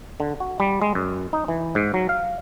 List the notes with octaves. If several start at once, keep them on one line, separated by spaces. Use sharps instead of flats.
D3
F#4
G3
G#3
F#2
D#4
E3
G#2
F#3
F5